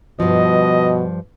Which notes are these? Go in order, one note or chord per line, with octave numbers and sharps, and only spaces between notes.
G2 B2 F3 D#5